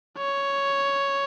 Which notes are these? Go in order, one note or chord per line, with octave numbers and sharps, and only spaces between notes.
C#5